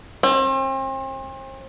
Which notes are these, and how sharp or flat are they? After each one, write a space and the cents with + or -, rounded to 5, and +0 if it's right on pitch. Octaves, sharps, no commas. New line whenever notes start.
C4 +40